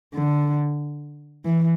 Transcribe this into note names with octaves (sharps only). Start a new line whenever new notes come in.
D3
E3